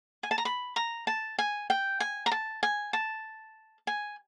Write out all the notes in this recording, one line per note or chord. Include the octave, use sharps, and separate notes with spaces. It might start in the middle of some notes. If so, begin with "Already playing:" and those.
G#5
A5
A#5
B5
A#5
A5
G#5
G5
G#5
A#5
A5
G#5
A5
G#5